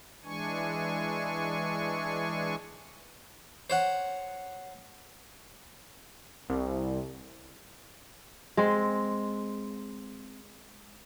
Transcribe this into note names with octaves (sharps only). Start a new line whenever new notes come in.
E3 G#3 D4 G#5 C#6
C5 C#5 F#5
C2
G#3 C4